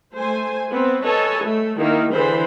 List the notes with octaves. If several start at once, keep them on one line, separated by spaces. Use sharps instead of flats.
A3 C5 G#5
B3 C4 B4
A4 B4 C#5 D#5 G#5 A5
A3
D#3 A#3 E4
D3 E3 G#4 C5 B5